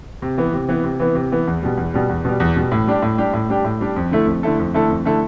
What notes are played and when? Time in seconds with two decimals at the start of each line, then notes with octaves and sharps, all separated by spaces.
0.22 C3
0.38 E3 B3
0.53 C3
0.68 E3 B3
0.84 C3
0.99 E3 B3
1.15 C3
1.32 E3 B3
1.47 E2
1.63 B2 G3
1.77 E2
1.94 B2 G3
2.09 E2
2.25 B2 G3
2.40 E2
2.56 B2 G3
2.71 A2
2.87 G3 D4 G4
3.02 A2
3.18 G3 D4 G4
3.33 A2
3.49 G3 D4 G4
3.64 A2
3.81 G3 D4 G4
3.96 F2
4.11 D3 A3 E4 A4
4.27 F2
4.43 D3 A3 E4 A4
4.59 F2
4.74 D3 A3 E4 A4
4.89 F2
5.05 D3 A3 E4 A4